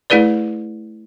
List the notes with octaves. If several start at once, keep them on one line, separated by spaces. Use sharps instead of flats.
A3 E4 G#4 B4 D5